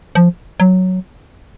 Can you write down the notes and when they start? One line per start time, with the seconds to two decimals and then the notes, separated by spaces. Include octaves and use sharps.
0.15 F3
0.60 F#3